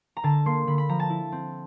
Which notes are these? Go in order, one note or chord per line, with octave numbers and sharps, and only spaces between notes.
A#5
D3 A5
A#3 C6
D3 B5
B5
F3 A#5
A5
E4
C4